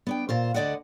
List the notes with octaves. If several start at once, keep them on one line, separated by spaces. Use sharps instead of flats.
B3 D4 G5
A#2 F4 C5
D2 D3 F#4 D5 D#5 F#5